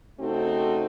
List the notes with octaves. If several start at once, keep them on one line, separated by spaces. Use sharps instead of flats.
C#3 A3 C4 D#4 F#4 A4